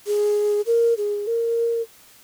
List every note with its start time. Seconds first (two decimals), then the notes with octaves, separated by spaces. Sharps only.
0.07 G#4
0.66 A#4
0.98 G#4
1.27 A#4